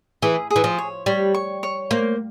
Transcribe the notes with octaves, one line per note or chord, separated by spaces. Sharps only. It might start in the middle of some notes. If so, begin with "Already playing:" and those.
E3 G#4
G#4
E3
F3
C#5
G3 C#5
C#6
C#5
A#3 C5